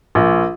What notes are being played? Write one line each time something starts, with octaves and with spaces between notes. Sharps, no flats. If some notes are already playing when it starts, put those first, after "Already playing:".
A#1